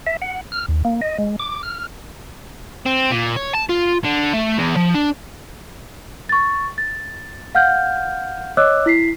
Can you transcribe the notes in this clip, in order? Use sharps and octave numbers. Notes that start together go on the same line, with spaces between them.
E5
F#5
F6
D#2
A#3
D#5
G#3
D6
F6
C4
A#2
C#5
A5
F4
D3
A3
E2
F3
D4
C#6 A6
A6
F5 F#5 F6 G6
C#5 D#5 D6 E6 F#6
E4 B6 C7